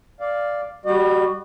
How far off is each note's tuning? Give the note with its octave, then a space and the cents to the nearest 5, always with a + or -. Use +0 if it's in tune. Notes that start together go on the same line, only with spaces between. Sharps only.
D5 +0 F5 +0
G3 +0 F#4 +15 D#5 -45